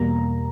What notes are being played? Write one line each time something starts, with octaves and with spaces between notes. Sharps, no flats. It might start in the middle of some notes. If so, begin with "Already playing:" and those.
Already playing: E2 B2 G3 A#3 A#5